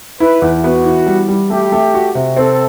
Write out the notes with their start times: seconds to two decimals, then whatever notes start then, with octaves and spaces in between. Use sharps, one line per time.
0.20 E4 B4
0.42 E2
0.64 B3 F#4
0.85 E3
1.06 G3
1.28 G3
1.50 A3 G4
1.72 A3
1.94 F#4
2.15 C3
2.37 C4 A4